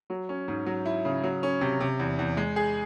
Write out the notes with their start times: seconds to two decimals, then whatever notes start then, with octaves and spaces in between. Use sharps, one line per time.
0.10 F#3
0.29 C#4
0.48 G#2
0.66 F#3
0.86 E4
1.05 C#3
1.23 F#3
1.43 C#4
1.61 C3
1.80 C3
1.99 E2
2.19 E2
2.37 G#3
2.56 G#4